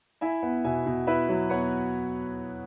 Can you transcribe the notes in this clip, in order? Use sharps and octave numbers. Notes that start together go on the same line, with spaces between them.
E4 E5 G#5
B3
B2 E5 G#5
B2
E4 B4 E5
F#3
B3 C#5 F#5